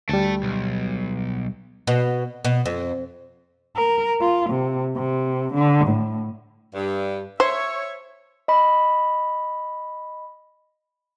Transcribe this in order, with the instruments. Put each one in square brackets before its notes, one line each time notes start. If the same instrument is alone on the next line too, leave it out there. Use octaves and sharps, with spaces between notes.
[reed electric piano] D2 G3 [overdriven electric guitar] A3 A5
[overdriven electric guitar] B1
[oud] B2
B2
F2
[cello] A#4
F4
C3
C3
D3
A2
[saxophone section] G2
[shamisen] C5 [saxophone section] C#5 E5
[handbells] D#5 B5